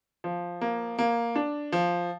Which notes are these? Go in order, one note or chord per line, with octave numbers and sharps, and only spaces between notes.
F3
A#3
A#3
D4
F3